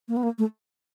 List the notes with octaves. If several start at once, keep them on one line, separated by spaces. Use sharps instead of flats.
A#3
B3
A#3
A3